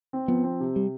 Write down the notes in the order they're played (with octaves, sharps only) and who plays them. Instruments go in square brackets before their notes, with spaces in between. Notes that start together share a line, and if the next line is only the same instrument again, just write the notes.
[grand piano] C4
[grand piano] F3 [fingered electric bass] B3
[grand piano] C4
C3
[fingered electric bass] G3